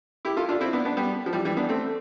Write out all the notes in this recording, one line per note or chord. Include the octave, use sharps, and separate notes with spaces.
E4 G4
F4 A4
D4 F4
C4 E4
B3 D4
B3 D4
G3 B3
F3
E3 G3
E3 G3
B3 D4
A3 C4